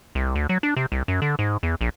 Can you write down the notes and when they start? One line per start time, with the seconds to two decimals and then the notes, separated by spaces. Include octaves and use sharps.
0.15 C2
0.35 D2
0.49 F#3
0.63 D4
0.77 C3
0.92 C2
1.08 F#2
1.22 D3
1.39 G#2
1.63 E2
1.81 A#1